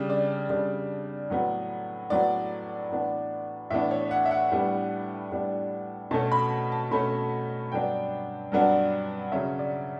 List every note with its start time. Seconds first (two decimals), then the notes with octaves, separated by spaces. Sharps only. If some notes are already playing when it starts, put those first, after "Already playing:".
Already playing: C#3 G3 D4
0.10 D5
0.50 C#3 G3 D4 D5
1.30 A2 F#3 B3
2.10 A2 F#3 B3 D5
2.91 A2 E3 B3 D4
3.70 A2 E3 B3 D4 E5
3.91 C#5
4.11 F#5
4.25 E5
4.31 F#5
4.51 A2 G3 B3 D4
5.31 A2 G3 B3 D4
6.11 B2 A3 C#4 A5
6.32 B5
6.72 A5
6.91 B2 A3 C#4 B5
7.72 G2 F#3 B3 D4 G5
8.52 G2 F#3 B3 D4
9.32 C#3 F#3 C#4 E5
9.59 D5